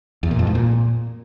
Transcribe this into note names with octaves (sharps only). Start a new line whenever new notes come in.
E2
A#2
F2
G#2
A#2